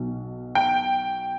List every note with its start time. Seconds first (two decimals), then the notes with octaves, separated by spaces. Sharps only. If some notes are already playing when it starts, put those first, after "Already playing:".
Already playing: B1 B2
0.55 G5